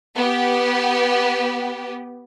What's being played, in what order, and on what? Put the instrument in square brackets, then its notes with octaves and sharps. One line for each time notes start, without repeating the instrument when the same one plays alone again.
[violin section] B3 G4